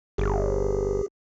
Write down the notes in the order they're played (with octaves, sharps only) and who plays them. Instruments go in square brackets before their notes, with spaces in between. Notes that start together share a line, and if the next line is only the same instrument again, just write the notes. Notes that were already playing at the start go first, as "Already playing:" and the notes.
[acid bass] G1 [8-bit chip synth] G4 G#4